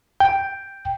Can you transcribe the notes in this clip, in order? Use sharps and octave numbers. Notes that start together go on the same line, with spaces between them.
G5